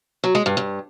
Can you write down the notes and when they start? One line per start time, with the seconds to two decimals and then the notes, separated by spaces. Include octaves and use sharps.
0.24 F#3
0.35 G#3
0.46 G2
0.57 G2